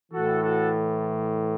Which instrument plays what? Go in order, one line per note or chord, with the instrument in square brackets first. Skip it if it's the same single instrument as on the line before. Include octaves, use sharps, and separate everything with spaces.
[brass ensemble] A2 E3 F#4 A4
F#4 A4